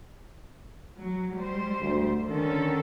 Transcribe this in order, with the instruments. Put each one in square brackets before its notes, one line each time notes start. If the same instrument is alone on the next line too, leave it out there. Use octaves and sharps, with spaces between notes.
[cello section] F#3
G3 G#3 C5
[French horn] D2
[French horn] D3 [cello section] D#3 C#4 A4